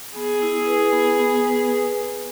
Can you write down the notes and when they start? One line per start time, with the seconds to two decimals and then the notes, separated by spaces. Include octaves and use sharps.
0.16 B3 G#4
0.42 E4
0.67 B4
0.93 B3
1.19 B3
1.45 B4